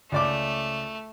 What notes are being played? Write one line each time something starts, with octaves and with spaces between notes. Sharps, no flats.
C#2 A3 D5 D6